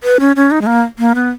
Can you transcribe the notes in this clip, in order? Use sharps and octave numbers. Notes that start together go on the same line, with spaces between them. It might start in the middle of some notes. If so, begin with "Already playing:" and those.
B4
C#4
C#4
D#4
G#3
A#3
A#3
B3